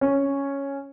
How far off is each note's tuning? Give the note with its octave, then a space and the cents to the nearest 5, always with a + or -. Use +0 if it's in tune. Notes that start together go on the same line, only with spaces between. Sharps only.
C#4 +0